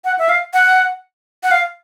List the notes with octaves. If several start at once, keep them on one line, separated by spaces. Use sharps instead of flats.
F#5
E5
F5
F#5
F#5
F5